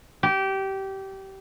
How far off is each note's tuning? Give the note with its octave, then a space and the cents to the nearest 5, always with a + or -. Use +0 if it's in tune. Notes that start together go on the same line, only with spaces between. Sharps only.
G4 -20